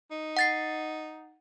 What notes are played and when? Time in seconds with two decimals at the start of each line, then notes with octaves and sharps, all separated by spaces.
0.11 D#4
0.37 F#5 A6 C7